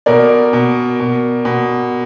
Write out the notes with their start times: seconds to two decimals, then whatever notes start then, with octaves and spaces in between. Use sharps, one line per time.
0.06 B2 A#4 D5
0.53 B2
1.00 B2
1.45 B2